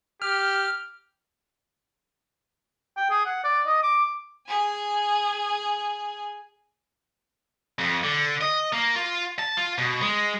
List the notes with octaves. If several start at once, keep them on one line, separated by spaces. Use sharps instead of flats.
G4 F6
G5
G#4
F#5
D5
D#5
D6
G#4 G#5
F2
D3
D#5
A#3
F4
A5
F4
B2
G#3